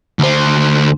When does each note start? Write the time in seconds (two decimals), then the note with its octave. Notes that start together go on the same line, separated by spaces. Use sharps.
0.19 D2 C5